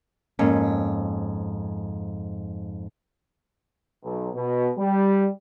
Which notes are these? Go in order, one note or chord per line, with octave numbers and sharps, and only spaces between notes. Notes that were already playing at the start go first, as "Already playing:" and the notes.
F2 G#2 A#3 C#4
B1
B2
G3